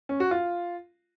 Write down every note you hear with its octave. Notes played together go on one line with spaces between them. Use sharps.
C#4
F#4
F4